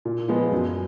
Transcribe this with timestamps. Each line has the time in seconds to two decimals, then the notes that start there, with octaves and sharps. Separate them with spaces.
0.05 A#2
0.28 F3 G#3 B3
0.52 F#2